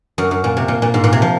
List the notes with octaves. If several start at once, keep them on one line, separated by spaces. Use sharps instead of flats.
F#2
F#2
A#2
C3
A#2
A#2
G#2
A#2
C3
F3